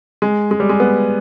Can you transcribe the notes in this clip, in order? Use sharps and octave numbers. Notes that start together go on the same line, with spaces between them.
G#3
G#3
G3
G#3
B3